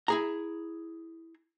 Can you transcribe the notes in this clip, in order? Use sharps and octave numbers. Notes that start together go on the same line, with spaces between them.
E4 G#4 A#5